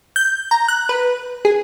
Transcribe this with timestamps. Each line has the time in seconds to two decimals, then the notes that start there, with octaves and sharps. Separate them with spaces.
0.16 G6
0.51 A#5
0.68 F#6
0.89 B4
1.45 G#4